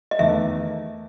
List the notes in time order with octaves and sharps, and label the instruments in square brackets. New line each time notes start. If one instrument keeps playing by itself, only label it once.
[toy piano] D#5
[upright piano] E2 D#3 A3 [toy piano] E5